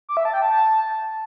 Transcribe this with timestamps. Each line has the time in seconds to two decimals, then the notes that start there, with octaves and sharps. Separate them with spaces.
0.09 D6
0.17 E5
0.25 A5
0.34 G5
0.42 A5